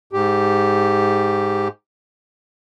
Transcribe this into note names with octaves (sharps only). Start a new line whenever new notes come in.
G#2 G4